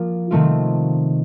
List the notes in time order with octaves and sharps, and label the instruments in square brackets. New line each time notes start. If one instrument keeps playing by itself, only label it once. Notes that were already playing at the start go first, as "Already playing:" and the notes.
Already playing: [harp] F3 A#3 F4
C3 D#3 A3 C4 F4